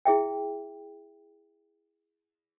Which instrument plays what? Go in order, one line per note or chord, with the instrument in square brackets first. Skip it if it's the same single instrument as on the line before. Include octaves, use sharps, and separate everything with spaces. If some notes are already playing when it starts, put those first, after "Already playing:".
[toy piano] E4 G#4 E5 G5